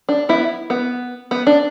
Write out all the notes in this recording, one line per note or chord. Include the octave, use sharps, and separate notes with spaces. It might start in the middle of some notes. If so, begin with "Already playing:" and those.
D4
B3 E4
B3
B3
D4